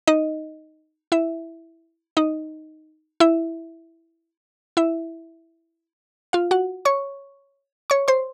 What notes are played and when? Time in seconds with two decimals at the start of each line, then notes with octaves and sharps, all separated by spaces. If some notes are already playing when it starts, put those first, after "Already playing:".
0.07 D#4 D#5
1.12 E4 E5
2.17 D#4 D#5
3.20 E4 E5
4.77 E4 E5
6.33 F4 F5
6.51 F#4 F#5
6.85 C#5 C#6
7.90 C#5 C#6
8.08 C5 C6